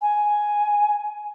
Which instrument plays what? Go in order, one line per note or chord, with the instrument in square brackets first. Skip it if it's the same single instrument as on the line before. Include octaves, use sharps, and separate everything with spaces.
[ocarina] G#5